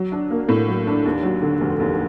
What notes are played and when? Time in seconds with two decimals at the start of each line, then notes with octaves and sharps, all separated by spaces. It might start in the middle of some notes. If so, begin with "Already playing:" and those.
Already playing: F#3
0.12 D4
0.30 A#3
0.49 A2
0.68 F#3
0.87 D4
1.05 D#2
1.23 F#3
1.42 D3
1.61 F1
1.80 D#2